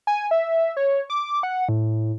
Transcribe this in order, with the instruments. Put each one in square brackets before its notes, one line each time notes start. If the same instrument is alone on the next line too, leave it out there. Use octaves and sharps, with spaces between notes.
[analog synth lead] G#5
E5
C#5
D6
F#5
A2